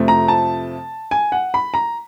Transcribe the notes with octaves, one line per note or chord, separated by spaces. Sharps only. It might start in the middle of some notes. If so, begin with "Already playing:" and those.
Already playing: F2 C3 F3 A3 C4
A#5
A5
G#5
F#5
B5
A#5